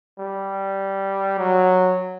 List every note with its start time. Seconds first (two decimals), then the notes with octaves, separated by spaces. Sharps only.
0.19 G3
1.38 F#3